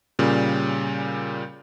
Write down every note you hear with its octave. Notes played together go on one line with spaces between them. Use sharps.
A#2 C#3 G3